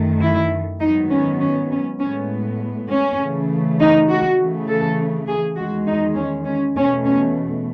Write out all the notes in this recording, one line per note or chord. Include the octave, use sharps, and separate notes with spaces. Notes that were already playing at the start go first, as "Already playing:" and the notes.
Already playing: F#2 D#3 A3
E4
G#2 D#3 F#3 B3 D#4
C#4
C#4
C#4
A2 G#3 B3 C#4
C#4
C#3 E3 A3
D#4
F#4
C#3 E3 A3
A4
G#4
E2 D#3 G#3 F#4
D#4
C#4
C#4
E2 B2 A3 C#4
C#4